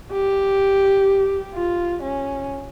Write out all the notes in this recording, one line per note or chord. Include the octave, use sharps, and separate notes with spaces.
G4
F4
C#4